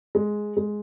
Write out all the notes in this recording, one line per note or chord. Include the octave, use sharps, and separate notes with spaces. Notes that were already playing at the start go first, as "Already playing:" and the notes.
G#3
G#3